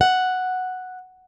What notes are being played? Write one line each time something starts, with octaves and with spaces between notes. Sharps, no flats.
F#5